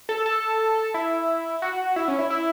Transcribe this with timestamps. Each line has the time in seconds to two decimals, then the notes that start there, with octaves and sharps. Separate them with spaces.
0.09 A4
0.26 A4
0.94 E4
1.62 F#4
1.96 E4
2.08 C#4
2.19 E4
2.30 E4